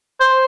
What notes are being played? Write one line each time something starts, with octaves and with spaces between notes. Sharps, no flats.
C5